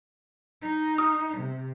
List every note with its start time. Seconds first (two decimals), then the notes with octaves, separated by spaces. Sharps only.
0.62 D#4
0.98 D#6 F6
1.37 C3